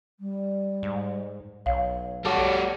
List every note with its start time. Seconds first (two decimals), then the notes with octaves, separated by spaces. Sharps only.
0.20 G3
0.83 G#2
1.66 B1 C#5 F5
2.25 G3 F#4 A4 C#5 A5 D6